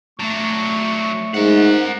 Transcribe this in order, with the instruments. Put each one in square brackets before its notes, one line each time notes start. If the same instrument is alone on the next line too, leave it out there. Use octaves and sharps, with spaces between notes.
[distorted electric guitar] F#3 D4 [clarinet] A3 [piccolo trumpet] C#6
[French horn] G#2 [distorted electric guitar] A#4 F#5